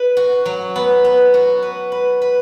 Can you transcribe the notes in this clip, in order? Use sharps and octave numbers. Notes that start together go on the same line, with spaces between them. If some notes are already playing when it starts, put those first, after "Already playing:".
Already playing: B4
F#4
F#3
B3
B3
F#4
B4
B4
B4